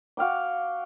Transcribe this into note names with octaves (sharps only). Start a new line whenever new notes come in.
F#4 F5 G5 D6